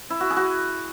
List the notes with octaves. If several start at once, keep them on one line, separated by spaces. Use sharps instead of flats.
E4
F#4
G#4
F#4